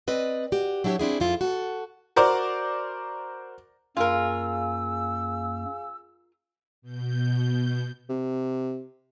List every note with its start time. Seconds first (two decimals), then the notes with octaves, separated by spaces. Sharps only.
0.08 C4 B4 D5 D#5
0.52 F#4 G4
0.84 F#3 D4 E4 G4 C#5
0.99 C4 D4 E4 G#4
1.20 F2 E4 F4
1.41 F#4 A4
2.16 F#4 A#4 C5 D5 D6
3.97 F#2 A#3 F4 G#4 A#4 F5 G#5 E6
6.82 B2 G6
8.09 C3